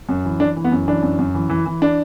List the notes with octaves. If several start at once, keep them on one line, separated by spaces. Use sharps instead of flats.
F#2
E3
E3 D4
E3
B3
F#2
E3 D4
F#2
F#2
E3
E3
E3
D4